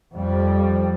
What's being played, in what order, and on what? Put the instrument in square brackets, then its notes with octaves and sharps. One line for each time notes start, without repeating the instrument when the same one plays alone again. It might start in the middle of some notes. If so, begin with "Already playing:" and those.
[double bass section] F2 G3